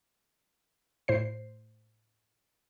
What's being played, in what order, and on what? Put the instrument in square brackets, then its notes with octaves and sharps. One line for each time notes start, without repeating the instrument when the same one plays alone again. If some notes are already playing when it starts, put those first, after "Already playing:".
[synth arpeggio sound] A2 C5 C7